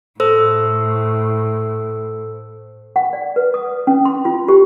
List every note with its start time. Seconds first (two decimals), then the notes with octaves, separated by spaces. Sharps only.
0.20 A2 A4 C5 E6
2.96 F#5
3.13 D5
3.36 B4
3.54 D#6
3.87 C#4
4.05 C6
4.25 F4
4.48 G4